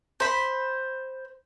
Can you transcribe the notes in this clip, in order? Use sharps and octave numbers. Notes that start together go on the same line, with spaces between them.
C5 B5